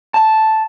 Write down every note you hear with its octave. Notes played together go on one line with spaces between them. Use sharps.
A5